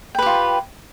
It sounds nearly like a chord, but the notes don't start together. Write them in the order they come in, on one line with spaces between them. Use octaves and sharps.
G5 B4 G4 F4